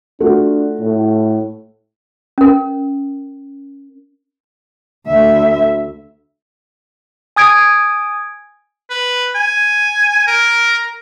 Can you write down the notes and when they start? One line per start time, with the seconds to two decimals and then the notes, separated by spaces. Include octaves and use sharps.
0.20 A3 D4 F4 F#4
0.80 A2
2.38 C#4 A#4
5.07 D2 E5
7.36 G#5 D#6 G#6 D7
8.90 B4
9.35 G#5
10.28 A#4